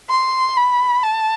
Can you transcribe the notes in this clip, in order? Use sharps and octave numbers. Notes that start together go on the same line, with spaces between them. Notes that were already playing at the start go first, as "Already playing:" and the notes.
C6
B5
A5